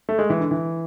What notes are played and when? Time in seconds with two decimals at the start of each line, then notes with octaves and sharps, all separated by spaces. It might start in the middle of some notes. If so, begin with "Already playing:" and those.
0.09 A3
0.19 G#3
0.30 E3
0.40 D3
0.51 E3